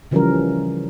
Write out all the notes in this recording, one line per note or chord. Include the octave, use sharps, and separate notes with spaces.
C#3 E3 F3 G3 C#4 A#4